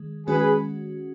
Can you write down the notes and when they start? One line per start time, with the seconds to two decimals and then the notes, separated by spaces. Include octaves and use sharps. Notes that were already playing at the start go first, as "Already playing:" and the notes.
Already playing: D#3 G#3
0.27 D#3 G#3 C#4 F#4 G#4 B4